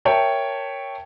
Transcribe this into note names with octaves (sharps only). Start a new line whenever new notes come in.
A#4 C#5 E5 G5 A5